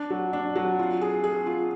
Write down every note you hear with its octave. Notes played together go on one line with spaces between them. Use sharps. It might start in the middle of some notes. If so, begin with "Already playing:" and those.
Already playing: D4
F#3
D4
F#3
F4
G#4
G#4
F4